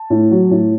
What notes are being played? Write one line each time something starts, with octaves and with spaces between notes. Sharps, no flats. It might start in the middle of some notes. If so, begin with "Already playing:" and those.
Already playing: A5
A2
F#3
A2